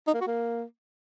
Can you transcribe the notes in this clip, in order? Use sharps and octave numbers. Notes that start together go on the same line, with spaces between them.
D#4
A#3
F#4
A#3